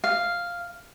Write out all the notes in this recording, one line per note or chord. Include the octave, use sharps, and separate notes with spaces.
F5